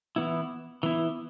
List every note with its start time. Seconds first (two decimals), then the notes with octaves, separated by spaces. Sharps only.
0.16 E3 B3 E4
0.83 E3 B3 E4